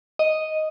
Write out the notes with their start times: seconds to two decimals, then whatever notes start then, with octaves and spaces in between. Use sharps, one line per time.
0.19 D#5